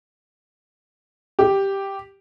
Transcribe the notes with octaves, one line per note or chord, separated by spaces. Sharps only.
G4